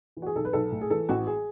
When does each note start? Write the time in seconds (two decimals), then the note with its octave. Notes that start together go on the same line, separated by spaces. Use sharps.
0.17 E3
0.22 F#4
0.26 G#4
0.35 B1 A4
0.45 B4
0.53 B1 A4
0.72 A2
0.81 G#4
0.90 E3 A4
1.09 A1 F#4
1.27 G#4